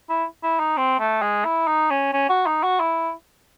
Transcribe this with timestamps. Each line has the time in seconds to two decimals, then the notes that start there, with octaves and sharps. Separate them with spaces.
0.09 E4
0.43 E4
0.59 D#4
0.77 C4
0.99 A3
1.22 G#3
1.44 E4
1.67 D#4
1.90 C#4
2.13 C#4
2.29 F#4
2.46 D#4
2.63 F#4
2.80 E4